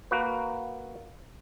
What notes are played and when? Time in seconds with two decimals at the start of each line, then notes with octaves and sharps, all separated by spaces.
0.11 A#3 F#4 B4